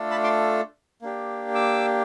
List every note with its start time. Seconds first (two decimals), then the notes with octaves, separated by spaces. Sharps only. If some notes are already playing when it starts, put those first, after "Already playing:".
Already playing: A3 D4 F4 A4
0.10 A5 B5
0.23 C6 D6
1.02 A#3 D4 G4
1.55 D6 E6